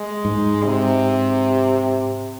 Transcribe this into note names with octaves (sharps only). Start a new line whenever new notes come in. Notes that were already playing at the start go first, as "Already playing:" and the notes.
Already playing: G#3
G#2
C3